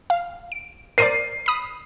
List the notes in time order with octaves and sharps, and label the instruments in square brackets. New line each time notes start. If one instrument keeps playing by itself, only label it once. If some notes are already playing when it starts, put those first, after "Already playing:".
[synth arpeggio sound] F5
D7
[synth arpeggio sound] A#4 C5 D5 [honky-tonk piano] C7 D#7
[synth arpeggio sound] B5 D#6